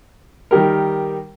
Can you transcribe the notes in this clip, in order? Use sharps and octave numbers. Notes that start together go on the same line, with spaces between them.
D#3 G3 G4 A#4